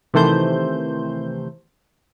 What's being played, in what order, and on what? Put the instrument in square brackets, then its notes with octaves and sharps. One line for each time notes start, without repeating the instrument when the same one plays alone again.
[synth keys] C3 D#3 E3 A3 C5 G6